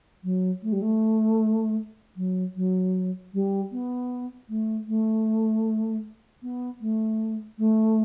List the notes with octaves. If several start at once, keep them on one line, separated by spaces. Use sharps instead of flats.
F#3
A3
G3
A3
F#3
F#3
G3
B3
A3
A3
B3
A3
A3